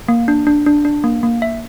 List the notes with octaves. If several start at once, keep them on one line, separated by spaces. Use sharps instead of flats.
A#3
D4
D4
D4
D4
A#3
A#3
E5